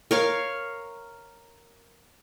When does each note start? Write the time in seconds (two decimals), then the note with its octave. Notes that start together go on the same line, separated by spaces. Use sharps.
0.11 A#4 C#5 F5